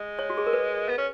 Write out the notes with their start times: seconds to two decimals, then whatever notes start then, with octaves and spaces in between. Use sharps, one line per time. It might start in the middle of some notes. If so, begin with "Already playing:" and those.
Already playing: G#3
0.19 C#5
0.30 F#4
0.38 G#4
0.47 A#4
0.53 B4
0.89 B3
0.98 C#4